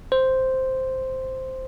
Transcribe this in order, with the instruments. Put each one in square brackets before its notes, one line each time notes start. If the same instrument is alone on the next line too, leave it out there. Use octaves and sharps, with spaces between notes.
[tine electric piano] C5